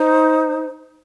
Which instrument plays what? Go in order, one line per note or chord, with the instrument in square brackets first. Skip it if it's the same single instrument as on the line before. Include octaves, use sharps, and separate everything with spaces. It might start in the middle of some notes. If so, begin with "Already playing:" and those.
Already playing: [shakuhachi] D#4 [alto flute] C5